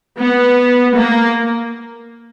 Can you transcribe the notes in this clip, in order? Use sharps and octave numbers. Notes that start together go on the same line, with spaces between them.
B3
A#3